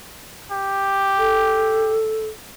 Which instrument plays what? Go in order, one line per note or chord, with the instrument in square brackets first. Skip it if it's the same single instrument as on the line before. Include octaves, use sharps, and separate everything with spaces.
[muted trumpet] G4
[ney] A4